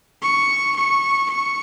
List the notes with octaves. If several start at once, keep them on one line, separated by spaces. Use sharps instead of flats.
C#6
C#6
C#6